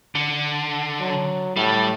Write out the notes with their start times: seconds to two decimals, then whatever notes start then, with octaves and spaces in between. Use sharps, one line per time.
0.15 D3
1.00 F#3
1.57 A2 G3